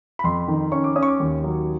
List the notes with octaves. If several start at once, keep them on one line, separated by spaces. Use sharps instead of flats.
B5
F2 C6
D#3
C#4 C#6
D6
C#4 D#6
C#6
D6
D#2
F#3